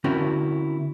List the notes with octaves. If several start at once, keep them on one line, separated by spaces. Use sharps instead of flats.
D3 C4 C#4 E4 F#4 A#4